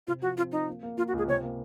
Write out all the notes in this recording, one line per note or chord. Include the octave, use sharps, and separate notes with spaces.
C3 F4
F3 F#4
C4 F4
F3 D#4
A#3
A#3
A#3 F4
F#4
C#2 G#4
C3 C#5
A#3